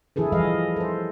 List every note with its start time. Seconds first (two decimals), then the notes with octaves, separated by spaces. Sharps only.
0.16 E3 E4 G#4 A4 B4
0.32 F3 G3 G#4 D#5 F5
0.76 A4 C5